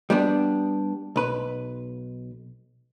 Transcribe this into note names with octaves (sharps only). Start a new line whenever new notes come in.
G3 B3 D4
B1 B4